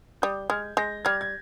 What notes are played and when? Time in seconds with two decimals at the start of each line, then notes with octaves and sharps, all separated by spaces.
0.22 G3 D#6 G6
0.50 G#3 F6 G#6
0.77 G#3 G6 A#6
1.05 G3 F6 G#6
1.21 G#6